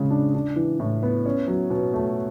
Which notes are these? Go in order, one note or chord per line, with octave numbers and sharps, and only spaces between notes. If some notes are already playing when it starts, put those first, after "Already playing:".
Already playing: C#3 G#3
D4
D4
E3
A2
B3
C#4
F#3
B2
A3